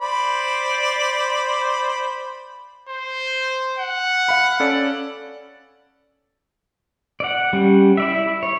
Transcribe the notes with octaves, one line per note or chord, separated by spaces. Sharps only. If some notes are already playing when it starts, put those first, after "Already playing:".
C5 D5 B5
C5
F#5
F5 B5
C#4 A4 D5
D5 F#5
G3 C#4
E4 D5 E5
C#5